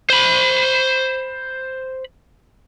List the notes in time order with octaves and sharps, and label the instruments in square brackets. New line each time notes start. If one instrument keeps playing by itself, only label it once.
[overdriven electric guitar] C5 B5